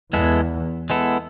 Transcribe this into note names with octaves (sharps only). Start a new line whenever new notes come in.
E2 G#3 B3 E4 A4
G#3 B3 E4 A4